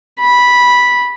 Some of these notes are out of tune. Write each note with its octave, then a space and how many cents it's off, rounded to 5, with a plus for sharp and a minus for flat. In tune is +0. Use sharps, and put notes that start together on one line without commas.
B5 -10